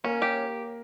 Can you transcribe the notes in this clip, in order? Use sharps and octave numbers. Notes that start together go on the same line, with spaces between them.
A#3 C#4
G4